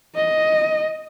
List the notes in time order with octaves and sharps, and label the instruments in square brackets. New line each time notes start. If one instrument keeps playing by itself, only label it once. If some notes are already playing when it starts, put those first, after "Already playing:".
[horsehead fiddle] D#5